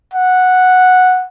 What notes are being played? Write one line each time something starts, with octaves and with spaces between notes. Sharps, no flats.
F#5